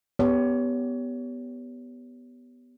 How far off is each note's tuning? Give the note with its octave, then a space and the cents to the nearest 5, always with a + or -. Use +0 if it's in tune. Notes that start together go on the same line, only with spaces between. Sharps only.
B3 +0 G4 +0 C#5 +30